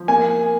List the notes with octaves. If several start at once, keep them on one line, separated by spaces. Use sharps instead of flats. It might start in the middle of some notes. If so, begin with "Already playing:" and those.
Already playing: F3
A#3 G#5